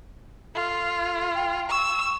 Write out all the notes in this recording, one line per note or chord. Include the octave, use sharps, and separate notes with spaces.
F4 A4
G5
C#6 E6